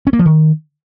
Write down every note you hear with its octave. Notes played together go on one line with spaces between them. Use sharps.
C#4
A#3
F3
D#3